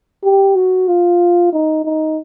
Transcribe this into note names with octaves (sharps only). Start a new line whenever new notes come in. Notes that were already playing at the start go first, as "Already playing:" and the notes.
G4
F#4
F4
D#4
D#4